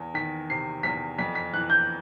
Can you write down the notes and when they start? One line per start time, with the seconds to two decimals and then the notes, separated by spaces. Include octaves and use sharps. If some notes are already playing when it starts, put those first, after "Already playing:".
Already playing: E2
0.14 D#3 B6
0.50 C3 C7
0.83 E2 B6
1.18 F2 B6
1.35 B6
1.54 E3 F#6
1.70 G6